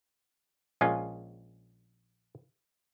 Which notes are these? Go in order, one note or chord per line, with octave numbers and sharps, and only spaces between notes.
A#1 G#3 C#4 F4